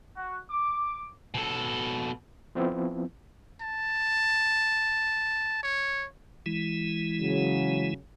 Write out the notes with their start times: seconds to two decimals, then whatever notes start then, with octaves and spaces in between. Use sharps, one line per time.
0.17 F#4
0.51 D6
1.34 B2 A4
2.55 F3 B3 C4 E4
3.61 A5
5.63 C#5
6.46 E3 G#3 E4
7.21 C#3 F#3